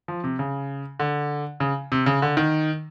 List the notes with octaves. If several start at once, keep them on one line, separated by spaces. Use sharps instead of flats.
F3
C3
C#3
D3
C#3
C3
C#3
D3
D#3